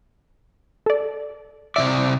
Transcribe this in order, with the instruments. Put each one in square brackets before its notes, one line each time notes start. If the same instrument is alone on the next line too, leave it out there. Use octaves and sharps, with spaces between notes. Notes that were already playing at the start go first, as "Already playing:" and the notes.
[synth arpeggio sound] A4 D5
[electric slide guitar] C3 E3 D5 [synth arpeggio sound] E5